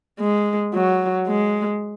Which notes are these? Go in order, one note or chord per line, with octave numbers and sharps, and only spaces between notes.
G#3
F#3
G#3